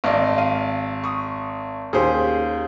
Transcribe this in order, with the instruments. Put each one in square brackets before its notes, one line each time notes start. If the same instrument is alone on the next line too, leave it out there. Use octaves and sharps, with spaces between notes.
[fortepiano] G#1 [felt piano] D5 D#5 F5
[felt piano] F5 D#7
C#6 D#6
[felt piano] D#2 C#4 G4 [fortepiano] G#4 C5